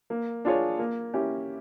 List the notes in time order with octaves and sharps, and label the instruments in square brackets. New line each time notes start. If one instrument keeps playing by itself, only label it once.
[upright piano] A#3
D4 F4 G#4 C#5
A#3
C#4 E4 G4